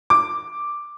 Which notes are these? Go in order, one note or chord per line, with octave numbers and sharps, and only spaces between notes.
D6